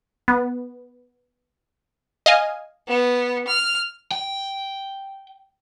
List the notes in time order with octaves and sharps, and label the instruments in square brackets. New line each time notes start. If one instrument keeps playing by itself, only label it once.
[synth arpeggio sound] B3
D#5 F5 G#5
[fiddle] B3
F6
[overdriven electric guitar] G5